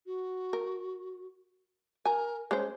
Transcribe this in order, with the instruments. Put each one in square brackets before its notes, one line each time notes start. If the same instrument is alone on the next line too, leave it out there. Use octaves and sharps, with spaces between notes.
[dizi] F#4
[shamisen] A#4
[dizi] A#4 [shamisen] G#5 A#5
[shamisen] G#3 C#4 C5 [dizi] C#5